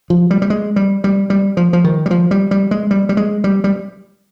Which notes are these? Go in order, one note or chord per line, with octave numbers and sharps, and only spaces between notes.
F3
G3
G3
G#3
G3
G3
G3
F3
F3
D#3
G3
F3
G3
G3
G#3
G3
G3
G#3
G3
G3